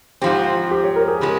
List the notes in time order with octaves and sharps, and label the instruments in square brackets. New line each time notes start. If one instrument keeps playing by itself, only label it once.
[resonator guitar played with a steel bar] G#2 F3 C4 [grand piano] G4
[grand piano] G4
C#5
A#4
G#4
[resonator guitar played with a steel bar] C#3 F3 G#3 [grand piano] G4